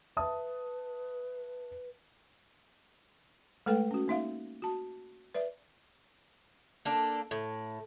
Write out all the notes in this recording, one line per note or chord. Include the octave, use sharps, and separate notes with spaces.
B4 E5 A5 D#6
G#3 A3 A4 B4 G5
C#4 F#4
A#3 D#4 E5 F5
F#4 A5
B4 D5 E5
A#3 D4 A4
A2